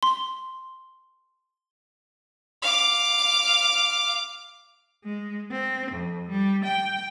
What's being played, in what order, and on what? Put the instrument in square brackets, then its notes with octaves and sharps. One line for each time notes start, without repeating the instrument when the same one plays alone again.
[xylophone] C6
[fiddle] F5 D6
[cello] G#3
C4
F2
G3
G5